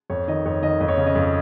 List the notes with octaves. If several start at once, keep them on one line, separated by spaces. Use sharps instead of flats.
F2 C#5
D#3 D#5
F2 C#5
D#3 D#5
F2 D#5
C#5
C#3
D#5
F2